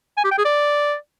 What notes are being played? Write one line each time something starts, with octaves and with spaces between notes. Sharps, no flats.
G#5
G4
G5
G#4
D5